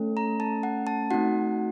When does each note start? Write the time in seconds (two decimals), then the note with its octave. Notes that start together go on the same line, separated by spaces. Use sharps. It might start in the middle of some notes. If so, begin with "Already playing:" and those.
Already playing: A3 C#4 A4
0.17 A#5
0.40 A5
0.63 F#5
0.87 A5
1.11 A3 C4 D#4 F#4 F#5